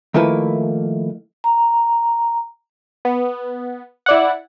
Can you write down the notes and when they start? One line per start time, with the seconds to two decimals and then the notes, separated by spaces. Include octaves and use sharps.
0.14 D#3 F3 A3 A#3 E4 B4
1.44 A#5
3.05 B3
4.06 E4 D5 F#5